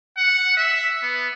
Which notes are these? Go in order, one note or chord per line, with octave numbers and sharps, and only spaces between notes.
F#5
E5
B3